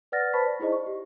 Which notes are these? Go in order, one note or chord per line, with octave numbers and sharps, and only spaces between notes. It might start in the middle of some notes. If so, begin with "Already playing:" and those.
B4 D5 F#5 F6 A6 A#6
B4 C5 A5 B5 C#6 B6
D5
D#4 E4 G#4 C5 D#5
C#6
G4